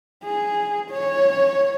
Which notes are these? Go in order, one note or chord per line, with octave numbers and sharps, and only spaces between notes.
G#4
C#5